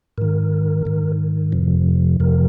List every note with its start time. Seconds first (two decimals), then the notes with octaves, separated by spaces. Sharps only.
0.18 G#2 D#3 A#4
0.85 G#2 D#3
1.52 F2 C3 F3
2.20 F2 C3 F3 A#4